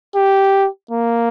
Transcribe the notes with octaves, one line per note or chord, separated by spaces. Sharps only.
G4
A#3